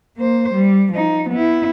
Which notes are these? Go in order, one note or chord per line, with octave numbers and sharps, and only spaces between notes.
A#3 C5
G3
F3 D#4
B3 E4